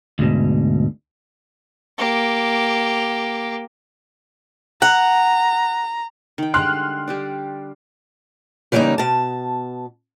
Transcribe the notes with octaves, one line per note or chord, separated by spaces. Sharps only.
D2 G#2 B2
A#3 G4
F#5 A#5
D#3 G5
D3 G3 G#3 C6 F6 F#6
G3 G4 D5
C#3 E3 G3 G#3 A#3 D#4
B2 A5